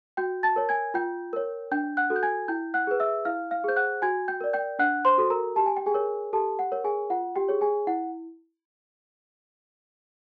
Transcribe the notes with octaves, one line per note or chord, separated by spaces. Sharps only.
F#4 G5 G6
A5 A6
A#4 C#5
G#5 G#6
F4 G5 G6
A#4 C#5
D4 G5 G6
F#5 F#6
F#4 A4
G6
G#5 G#6
E4 G5 G6
F#5 F#6
G#4 B4
E5 E6
E4 F5 F6
F5 F6
G#4 C5 G6
F#5 F#6
F#4 G#5 G#6
G5 G6
A#4 D5
G5 G6
D4 F#5 F#6
C5 C6
F#4 A4
A#4 A#5
G4 A5
G#5
G5
G#4 G#5
A#4 C#5
G4 A4 A5
F#5
A#4 C#5
G#4 G#5
F4 F#5
G4 G5
G#4 C#5
G#4 G#5
E4 F#5